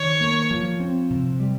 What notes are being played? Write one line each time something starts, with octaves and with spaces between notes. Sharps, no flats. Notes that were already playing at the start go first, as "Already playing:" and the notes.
Already playing: D#3 C#5
A#3
F3
C4
C3
G3